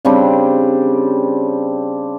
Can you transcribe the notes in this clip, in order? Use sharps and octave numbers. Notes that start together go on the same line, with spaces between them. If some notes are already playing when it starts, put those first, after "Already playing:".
C#3 G3 C4 D4